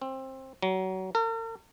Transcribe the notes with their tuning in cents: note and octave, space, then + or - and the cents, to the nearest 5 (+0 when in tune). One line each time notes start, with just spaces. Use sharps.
C4 +20
F#3 +25
A#4 -45